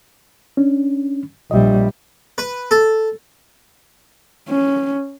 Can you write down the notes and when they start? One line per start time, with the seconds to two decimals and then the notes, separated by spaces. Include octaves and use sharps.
0.57 C#4 D4
1.51 A#1 G3 D#5 E5
2.38 B4
2.71 A4
4.49 C#4